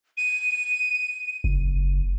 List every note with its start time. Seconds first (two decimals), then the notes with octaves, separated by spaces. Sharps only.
0.17 D#7
1.44 F#1